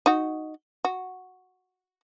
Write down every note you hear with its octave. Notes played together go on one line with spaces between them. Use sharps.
D#4 F#4
F#4